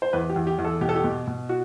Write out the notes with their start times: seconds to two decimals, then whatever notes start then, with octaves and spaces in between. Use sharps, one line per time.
0.02 C5
0.13 E2 B4
0.30 G4
0.36 E2
0.47 G4
0.58 E2
0.65 A4
0.81 B2 G4
0.89 A4
0.96 G4
1.04 B2
1.27 B2
1.49 F#4